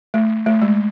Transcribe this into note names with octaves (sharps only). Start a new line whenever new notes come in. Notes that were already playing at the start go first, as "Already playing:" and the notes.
A3
A3
G#3